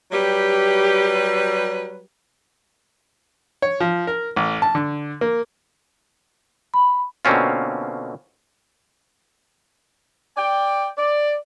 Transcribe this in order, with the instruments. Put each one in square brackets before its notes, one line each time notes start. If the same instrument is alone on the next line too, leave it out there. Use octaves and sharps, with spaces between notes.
[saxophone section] F#3 G3 B4 [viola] G4
[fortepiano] C#5
F3
A#4
A1
A5
D3
A#3
[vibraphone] B5
[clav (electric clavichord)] B2 D3 A#3 C4 C#4 F4
[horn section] D5 G5
D5